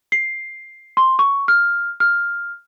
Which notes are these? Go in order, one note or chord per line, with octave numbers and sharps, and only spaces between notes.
C7
C6
C#6
F6
F6